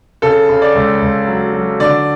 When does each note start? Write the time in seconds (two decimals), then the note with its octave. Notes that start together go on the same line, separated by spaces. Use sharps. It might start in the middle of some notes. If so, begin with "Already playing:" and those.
0.22 C#3 A4
0.49 C#3
0.62 D5
0.75 C#2
1.01 C#2
1.27 F#3
1.53 F#3
1.80 D3 D5